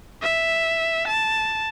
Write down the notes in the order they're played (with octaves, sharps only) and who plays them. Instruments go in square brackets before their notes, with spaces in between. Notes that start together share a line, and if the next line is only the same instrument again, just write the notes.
[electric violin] E5
A5